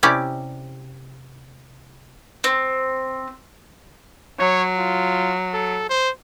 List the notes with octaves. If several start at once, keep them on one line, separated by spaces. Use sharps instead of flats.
C3 C#4 E4 G4 D5
C4
F#3 C#5
F4
A4
C5